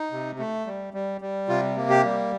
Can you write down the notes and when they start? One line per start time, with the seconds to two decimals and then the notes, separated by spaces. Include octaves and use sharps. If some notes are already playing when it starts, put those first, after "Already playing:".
Already playing: D#4
0.12 C3
0.39 A3
0.66 G3
0.94 G3
1.21 G3
1.48 C3 F4
1.77 A#3
1.90 G4
2.04 G3